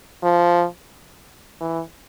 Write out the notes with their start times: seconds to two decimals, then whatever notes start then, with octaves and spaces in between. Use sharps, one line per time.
0.23 F3
1.61 E3